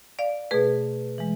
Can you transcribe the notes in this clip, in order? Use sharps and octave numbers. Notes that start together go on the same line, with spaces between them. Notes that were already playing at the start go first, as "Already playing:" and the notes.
D5 F5
B2 A3 G#4 B4
E3 G#3